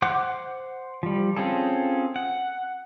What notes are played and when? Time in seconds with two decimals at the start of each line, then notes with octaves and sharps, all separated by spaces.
0.02 C5 F#5 D6 F#6
1.03 F3 G3
1.36 C4 C#4 F4 G#4 A4
2.16 F#5